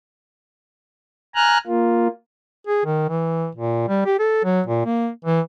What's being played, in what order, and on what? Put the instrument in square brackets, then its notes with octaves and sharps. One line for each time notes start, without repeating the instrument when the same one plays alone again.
[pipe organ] G#5 A#5 F6 F#6
A#3 F4
[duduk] G#4
D#3
E3
A#2
G3
G4
A4
F#3
A#2
A#3
E3